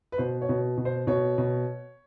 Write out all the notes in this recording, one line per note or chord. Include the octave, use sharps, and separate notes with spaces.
B4
B2 C5
C#5
B2
B2
C5
B2 C#5
B2